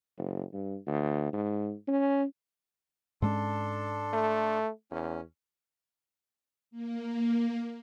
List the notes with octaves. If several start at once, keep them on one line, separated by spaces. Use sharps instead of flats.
F#1
G2
D2
G#2
C#4
G#2 G#3 C#4 D4 A4 C6
A3
E2 C#4
A#3